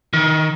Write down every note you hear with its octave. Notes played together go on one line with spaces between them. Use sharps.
D#3